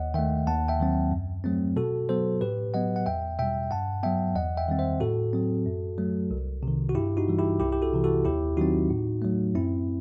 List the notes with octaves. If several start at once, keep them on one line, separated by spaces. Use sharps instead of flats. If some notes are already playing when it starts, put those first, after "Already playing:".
Already playing: D#2 D#5 F#5
D#3 A3 E5 G5
D#2 F#5 A5
E5 G5
D#3 F#3 C4
F#2
F#3 A3 C4
B2 F#4 A4
F#3 B3 A4 C5
A2 G4 B4
F#3 B3 D#5 F#5
F#5
E2 E5 G5
B2 G3 E5 G5
G2 F#5 A5
F#3 B3 E5 G5
E2 D#5 F#5
E5 G5
D#3 G3 C4
C5 E5
A2 F#4 A4
F#3 C4
F#2
F#3 A3
C2
C3 D#3
F#4
G2 E4 G4
D#4 F#4
E3 G3
E4 G4
C2 E4 G4
G4
F#4 A4
C3 E3
F#4 A4
D#2 E4 G4
D#3 F#3 C4 D#4 F#4
A2
F#3 A3
F#2 C4 E4